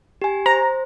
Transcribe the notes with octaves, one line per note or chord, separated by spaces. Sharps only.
G4 G#5
C5 A#5